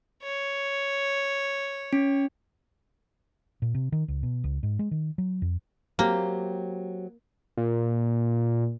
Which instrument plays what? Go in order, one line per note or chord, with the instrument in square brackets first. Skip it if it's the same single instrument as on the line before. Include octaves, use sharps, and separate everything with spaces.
[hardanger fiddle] C#5
[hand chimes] C#4
[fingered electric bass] A#2
C3
D#3
C#2
B2
C#2
G#2
G#3
D#3
F#3
F2
[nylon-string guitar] F#3 C4 G4 [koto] A#3
[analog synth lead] A#2